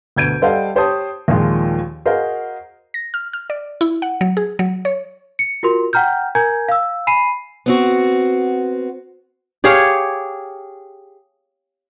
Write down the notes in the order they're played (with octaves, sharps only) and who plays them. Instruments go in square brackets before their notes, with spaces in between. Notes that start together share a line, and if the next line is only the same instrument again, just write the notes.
[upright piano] D2 B2 G6 G#6 D7 D#7
G3 A4 C5 D#5 F5 F#5
G4 C5 C#5 A5 D#6
D#2 A#2 D#3 F3 G#3
F#4 G#4 A#4 C5 D#5 F5
[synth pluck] A#6
F6
F6
D5
E4
F#5
F#3
G#4
F#3
C#5
[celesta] C#7
F4 F#4 A#4 C6
F#5 G5 A#5 F6 G6
A#4 G#5 A#5 G6 G#6
F5 E6
G#5 B5 C7 D#7
[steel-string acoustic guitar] B3 C4 F#4
[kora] G4 G#4 C#5 F5